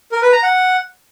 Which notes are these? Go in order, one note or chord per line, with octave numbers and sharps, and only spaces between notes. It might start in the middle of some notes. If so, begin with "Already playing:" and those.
A#4
B4
A#5
F#5